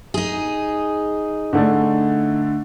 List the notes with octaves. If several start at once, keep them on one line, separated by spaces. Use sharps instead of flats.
D#4 G#4
D3 A3 D4